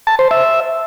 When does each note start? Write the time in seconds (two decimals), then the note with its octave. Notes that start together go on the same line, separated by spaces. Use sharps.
0.07 A5
0.19 C5
0.31 E5